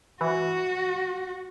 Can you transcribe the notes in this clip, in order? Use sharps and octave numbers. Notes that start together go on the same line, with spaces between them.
E3 F#4